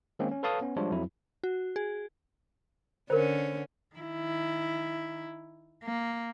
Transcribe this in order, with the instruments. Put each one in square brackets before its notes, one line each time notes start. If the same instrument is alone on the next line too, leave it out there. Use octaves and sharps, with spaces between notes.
[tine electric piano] D#3 G#3 A#3 C4 C#4
C#4
A4 B4 C#5 F5 A5 D#6
B3 C#4
F3 G3 G#3 D4 F4 C#5
F2 F#3 E4
[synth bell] F#4
G#4
[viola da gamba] D3 C#4 [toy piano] A#4 C5
[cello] D#3 E4
A#3